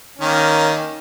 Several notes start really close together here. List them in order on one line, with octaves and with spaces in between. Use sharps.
C#4 D#3 A#3